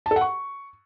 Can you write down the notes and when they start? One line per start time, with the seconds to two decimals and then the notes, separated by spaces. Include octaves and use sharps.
0.06 A5
0.11 A4
0.16 F#5
0.21 C#6